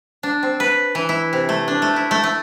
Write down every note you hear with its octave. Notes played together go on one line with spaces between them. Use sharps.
D4
C4
B4
E3
E4
C3
A3
D4
A3
E4
A3
A3